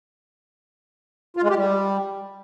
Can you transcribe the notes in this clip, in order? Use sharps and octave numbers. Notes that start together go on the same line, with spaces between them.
F4
G#3
G4
G3